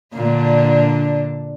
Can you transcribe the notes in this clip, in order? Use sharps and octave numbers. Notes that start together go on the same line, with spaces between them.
A#2 D3 D4